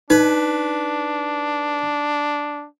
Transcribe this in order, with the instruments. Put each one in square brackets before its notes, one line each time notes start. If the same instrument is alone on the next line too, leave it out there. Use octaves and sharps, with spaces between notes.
[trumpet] D4 [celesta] D#4 [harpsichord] B4